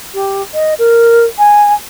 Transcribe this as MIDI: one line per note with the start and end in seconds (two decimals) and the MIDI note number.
0.13 0.41 67
0.53 0.72 75
0.78 1.24 70
1.38 1.72 80